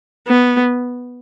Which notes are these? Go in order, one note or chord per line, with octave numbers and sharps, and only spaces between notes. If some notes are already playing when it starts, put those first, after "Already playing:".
B3